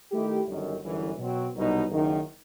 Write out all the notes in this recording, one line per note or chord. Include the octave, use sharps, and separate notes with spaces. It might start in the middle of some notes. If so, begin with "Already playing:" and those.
D#3 A3 E4 G4
G1 F#2 D#3
G1 F#2 E3
B2 F#3 C4 F#4
C2 B2 F#3 B3 D#4
F#1 F#2 D#3